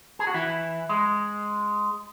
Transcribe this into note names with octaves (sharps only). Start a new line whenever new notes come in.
G#4
F#4
E3 E4
G#3